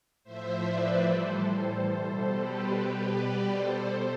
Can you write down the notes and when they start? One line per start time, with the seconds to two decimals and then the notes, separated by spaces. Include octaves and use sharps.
0.24 A2 F3 C5 E5
0.65 B4 D5
1.05 A2 E3 G3 A4 C5
1.87 B2 G3
2.28 G4 B4
2.69 B2 G3
3.10 B4 D5
3.50 B2 G3 A4 C5